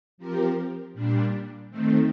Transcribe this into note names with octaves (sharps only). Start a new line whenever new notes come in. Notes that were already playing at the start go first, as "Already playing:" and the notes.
F3 C4 G4 A#4
A#2 G3 D4
D#3 A3 C4